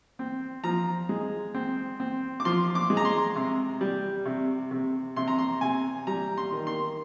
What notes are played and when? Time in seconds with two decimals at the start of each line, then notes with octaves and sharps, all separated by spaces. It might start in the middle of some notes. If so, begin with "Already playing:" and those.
0.19 C4
0.64 F3 A#5
1.09 G#3
1.54 C4
2.00 C4
2.40 D6
2.45 F3 C6
2.75 D6
2.90 G#3
2.97 A#5
3.05 C6
3.36 C3
3.81 G3
4.26 C3
4.71 C3
5.16 C3 C6
5.28 A#5
5.38 C6
5.61 C3 G#5
6.07 G3 A#5
6.38 C6
6.52 D#3
6.67 C6